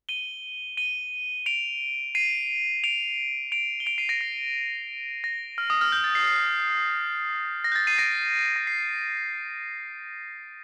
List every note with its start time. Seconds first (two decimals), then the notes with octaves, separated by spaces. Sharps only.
0.09 D#7 G7
0.77 D#7 G7
1.46 D7 F7
2.15 C7 D#7
2.84 D7 F7
3.52 D7 F7
3.80 G7
3.86 D7 F7
3.98 C7 D#7
4.09 A#6 D7
4.21 C7
5.24 A#6
5.58 F6
5.70 D#6
5.81 F6
5.92 G6
6.04 A6
6.15 C7
6.27 C7
7.64 A#6
7.72 G6
7.76 A6
7.87 C7 D#7
7.98 A#6 D7
8.56 A#6
8.67 C7